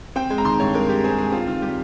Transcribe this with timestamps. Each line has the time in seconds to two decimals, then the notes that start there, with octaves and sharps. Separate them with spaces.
0.16 C4 G5
0.30 G#3
0.38 A#5
0.45 D#3 C6
0.60 G2 C#5
0.74 G#3 A#4
0.89 G#3 G4
1.04 C4 G#4
1.18 G#3 G#4
1.32 C4 F4
1.47 D#3 F4
1.62 G3 G4